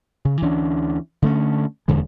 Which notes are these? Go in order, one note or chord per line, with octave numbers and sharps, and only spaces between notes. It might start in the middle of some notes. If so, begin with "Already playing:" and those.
C#3
D2 E3 C#4 D4
D3 A3 C#4
D#1 E2 D3 G#3